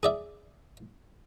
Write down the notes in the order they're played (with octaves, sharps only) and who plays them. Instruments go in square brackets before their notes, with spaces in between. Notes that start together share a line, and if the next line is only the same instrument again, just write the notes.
[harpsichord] G#4 D5 E5